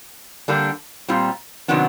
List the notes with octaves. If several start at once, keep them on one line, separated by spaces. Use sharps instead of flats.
D3 G3 A#3 D4
A#2 G3 C4 F4
C3 D#3 F#3 B3 D4